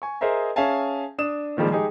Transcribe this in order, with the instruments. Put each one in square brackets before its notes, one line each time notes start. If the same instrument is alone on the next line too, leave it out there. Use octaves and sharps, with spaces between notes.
[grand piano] G#5 C#6
G#4 A#4 C5 D#5 E5 A#5
C#4 G#4 E5 F5 G#5 A5
D4 D#6 E7
A#2 D#3 F3 G3 G#3
G#3 D#4 G4 G#4